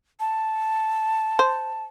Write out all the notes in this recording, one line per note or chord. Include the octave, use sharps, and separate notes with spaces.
A5
C5